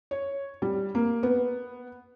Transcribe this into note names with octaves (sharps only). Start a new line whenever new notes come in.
C#5
G3
A#3
B3